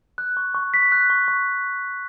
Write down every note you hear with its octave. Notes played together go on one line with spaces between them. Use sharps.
F#6
C#6
C#6
B6
F#6
C#6
C#6